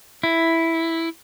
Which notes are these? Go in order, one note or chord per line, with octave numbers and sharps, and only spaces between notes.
E4